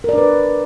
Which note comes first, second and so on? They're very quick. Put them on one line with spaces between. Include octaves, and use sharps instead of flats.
A#4 D5 D4 B4